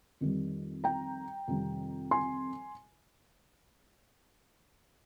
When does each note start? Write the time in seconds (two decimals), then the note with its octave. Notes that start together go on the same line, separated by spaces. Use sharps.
0.21 F2 D#3 G3
0.84 G5 A#5
1.48 F2 C3 D#3 G3
2.11 G#5 C6